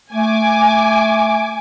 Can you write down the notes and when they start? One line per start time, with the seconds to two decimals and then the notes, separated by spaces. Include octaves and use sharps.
0.13 A3 G#5 D6